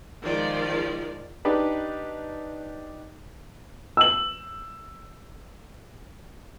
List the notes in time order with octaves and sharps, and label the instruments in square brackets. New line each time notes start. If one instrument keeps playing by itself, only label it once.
[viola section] D#3 F3 G#3 F4 A#4 D5
[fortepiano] D4 D#4 G4 B4
[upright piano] E6 F#7